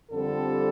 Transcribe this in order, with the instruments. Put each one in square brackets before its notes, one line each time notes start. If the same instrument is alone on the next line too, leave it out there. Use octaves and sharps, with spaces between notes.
[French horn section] F2 D3 G3 C4 A4